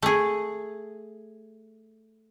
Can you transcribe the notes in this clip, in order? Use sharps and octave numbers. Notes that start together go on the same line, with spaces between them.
A3 G#4